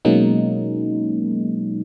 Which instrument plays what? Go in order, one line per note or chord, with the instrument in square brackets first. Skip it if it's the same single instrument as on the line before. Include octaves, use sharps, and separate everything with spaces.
[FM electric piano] B2 F#3 G#3 A#3 C#4 D#4